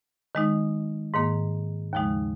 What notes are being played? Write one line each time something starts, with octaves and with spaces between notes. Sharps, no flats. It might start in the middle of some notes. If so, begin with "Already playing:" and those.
D#3 G#3 D#4
G#2 D#3 A#3
D#2 C#3 F3 G#3 D#4